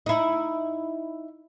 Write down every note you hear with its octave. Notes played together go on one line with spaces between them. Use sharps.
D#4 E4